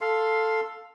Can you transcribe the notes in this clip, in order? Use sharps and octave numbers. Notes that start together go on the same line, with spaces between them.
A4 F5 C6